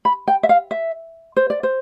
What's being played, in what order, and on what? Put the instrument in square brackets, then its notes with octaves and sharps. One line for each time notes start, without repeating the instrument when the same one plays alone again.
[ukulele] B5
G5
E5
F5
E5
C5
D5
C5